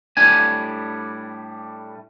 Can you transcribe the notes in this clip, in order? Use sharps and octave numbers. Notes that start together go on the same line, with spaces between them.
A2 G3 D4 G#5